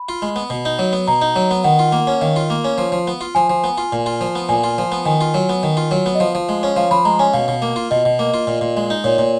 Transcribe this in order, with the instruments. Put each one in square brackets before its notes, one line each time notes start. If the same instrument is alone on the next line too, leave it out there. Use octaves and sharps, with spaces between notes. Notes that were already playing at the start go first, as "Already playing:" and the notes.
Already playing: [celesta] B5
[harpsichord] F4
G#3
B3
B2
D#4
F#3
B3
[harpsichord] B2 [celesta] A#5
[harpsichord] D#4
F#3
B3
[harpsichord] D#3 [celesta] F#5
[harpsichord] F4
A#3
C#4
[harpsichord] D#3 [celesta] F5
[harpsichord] F4
A#3
C#4
F3
F3
B3
F4
[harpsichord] F3 [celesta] G#5
[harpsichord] F3
B3
F4
A#2
F4
F3
B3
[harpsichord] A#2 [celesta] G#5
[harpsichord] F4
F3
B3
[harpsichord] D#3 [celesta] G#5
[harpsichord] F4
F#3
B3
D#3
F4
F#3
B3
[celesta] D#5
[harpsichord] F3 [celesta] F5
[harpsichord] F3
G#3
C#4
[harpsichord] F3 [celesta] F5
[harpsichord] F3 [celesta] B5
[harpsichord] G#3 [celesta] A#5
[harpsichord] C#4 [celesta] G#5
[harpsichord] B2 [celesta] F5
[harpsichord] B2
A#3
F4
[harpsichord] B2 [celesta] D#5
[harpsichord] B2
A#3
F4
A#2
A#2
G#3
D#4
[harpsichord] A#2 [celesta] C#5
[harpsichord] A#2